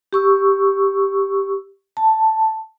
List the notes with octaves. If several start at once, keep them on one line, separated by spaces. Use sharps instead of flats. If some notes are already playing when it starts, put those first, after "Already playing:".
G4 C#6 E6
A5